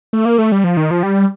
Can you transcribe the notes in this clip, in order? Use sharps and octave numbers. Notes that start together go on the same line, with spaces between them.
A3
A#3
A3
G3
F3
D#3
F3
G3